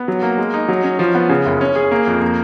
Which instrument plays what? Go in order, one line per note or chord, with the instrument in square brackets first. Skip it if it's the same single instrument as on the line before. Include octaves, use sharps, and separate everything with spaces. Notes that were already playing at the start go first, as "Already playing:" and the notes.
Already playing: [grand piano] B3
F#3
A#3
G#3
D#4
F#3
C#4
F3
B3
C#3
F#1
C#4
G#4
A#3
F2
A#3